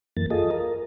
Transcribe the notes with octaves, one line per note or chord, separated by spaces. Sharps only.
F#2 E3 A#3 A6
F4 G#4 A4 D#5
A#4